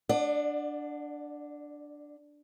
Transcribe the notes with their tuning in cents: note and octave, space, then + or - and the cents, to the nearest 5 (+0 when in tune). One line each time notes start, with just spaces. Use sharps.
D4 +0 D5 +30 F#5 -10